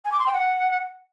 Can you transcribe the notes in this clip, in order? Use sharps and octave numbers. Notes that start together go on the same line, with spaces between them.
G#5
D6
C6
G5
F#5